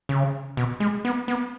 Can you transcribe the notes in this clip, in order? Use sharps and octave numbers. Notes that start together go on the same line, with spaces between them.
C#3
B2
G#3
B3
B3